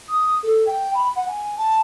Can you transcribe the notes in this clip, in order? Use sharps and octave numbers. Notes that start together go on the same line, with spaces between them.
D#6
A4
G5
B5
F#5
G#5
A5